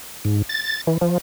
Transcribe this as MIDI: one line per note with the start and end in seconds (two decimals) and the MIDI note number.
0.25 0.42 44
0.49 0.81 93
0.87 0.98 52
1.01 1.18 53